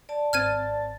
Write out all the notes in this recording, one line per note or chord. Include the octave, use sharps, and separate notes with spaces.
D5 A5
G#1 C4 F6 G#6 A6 D#7